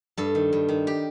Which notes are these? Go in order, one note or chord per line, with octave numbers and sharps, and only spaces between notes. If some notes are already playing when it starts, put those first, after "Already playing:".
G2 A4
D#3
G2
D#3
G4